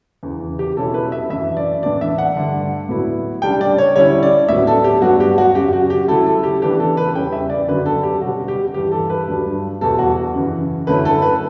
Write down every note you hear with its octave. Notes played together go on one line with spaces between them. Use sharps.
E2 C#3 E3
G4
B2 F#3 C#4 E4 A4
B4
E5
F#2 E3 A3 E5
D5
A2 E3 B3 D4 D5
E5
F#5
G2 D3 A3 D4
A2 F#3 B3 E4
C#3 G3 D4 G5
D5
C#5
D3 G3 C#4 E4 C#5
D5
A2 F#3 B3 E5
A4
G4
G2 F#3 B3 D4 F#4
G4
F#4
F#2 C#3 F#3 G4
F#4
G4
C#3 F#3 A3 E4 A4
A4
G4
C#3 E3 B3 D4 G4
A4
B4
E2 C#3 G3 C#4 G5
E5
D5
F#2 D3 F#3 B3 B4
A4
G4
B2 G3 C#4 F#4
G4
G2 E3 G3 G4
A4
B4
G2 F#3 A3 D4
E2 B2 G3 B3 A4
F#4
F#2 C#3 E3
F#2 D3 A3 C#4 E4 B4
A4
B4